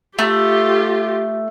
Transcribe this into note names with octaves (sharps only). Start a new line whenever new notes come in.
A3 F4 G4